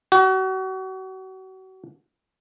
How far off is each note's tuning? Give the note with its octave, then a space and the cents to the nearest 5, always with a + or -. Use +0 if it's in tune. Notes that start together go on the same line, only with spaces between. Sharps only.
F#4 +35